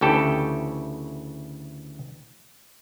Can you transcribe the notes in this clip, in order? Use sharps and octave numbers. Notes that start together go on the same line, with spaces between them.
D2 C#3 E3 G4 A4 G5